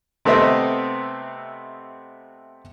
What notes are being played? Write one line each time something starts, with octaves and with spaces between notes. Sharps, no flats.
C3 A3 B3 C4 D#5 E5